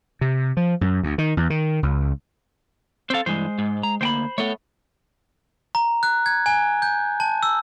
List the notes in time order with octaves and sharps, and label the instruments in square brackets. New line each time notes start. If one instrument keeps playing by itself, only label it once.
[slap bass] C3
F3
F#2
D2
D#3
E2
D#3
C#2
[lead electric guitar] C4 F5 [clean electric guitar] A4 C5
[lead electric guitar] G2 E3 [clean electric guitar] G#3 C5
[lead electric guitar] G#2
A#5
[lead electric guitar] D2 A#3 [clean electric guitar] C5 G5 B5
[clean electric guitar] A3 B3 [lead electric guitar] A4 C#5
[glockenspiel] A#5
F#6
G#6
G#5
G6
A5
E6